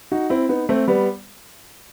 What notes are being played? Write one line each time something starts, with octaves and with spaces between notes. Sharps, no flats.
D#4 F#4
C4 E4
B3 D#4
A3 C4
G3 B3